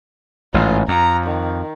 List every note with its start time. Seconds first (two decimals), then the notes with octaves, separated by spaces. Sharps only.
0.54 A1 G#2 F4
0.88 F2 A#5
1.26 D#3